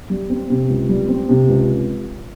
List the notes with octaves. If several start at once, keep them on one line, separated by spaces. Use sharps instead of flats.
G3
C4
C3
C#2
G3
C4
C3
C#2